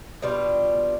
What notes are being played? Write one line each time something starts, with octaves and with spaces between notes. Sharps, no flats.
B2 G3 D4 F4